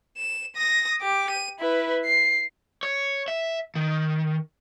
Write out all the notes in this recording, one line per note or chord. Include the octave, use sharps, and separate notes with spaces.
E7
D#6 A#6
G4 D6
D#7
E4 B4
C7
C#5
E5
D#3